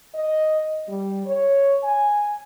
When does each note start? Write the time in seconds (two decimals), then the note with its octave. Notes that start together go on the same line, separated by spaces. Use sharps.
0.14 D#5
0.89 G3
1.26 C#5
1.83 G#5